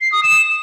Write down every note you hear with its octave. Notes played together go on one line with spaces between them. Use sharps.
C7
D#6
E7